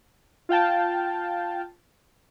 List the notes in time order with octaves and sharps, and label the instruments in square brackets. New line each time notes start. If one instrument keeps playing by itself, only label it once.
[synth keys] F4 F5 G5 A5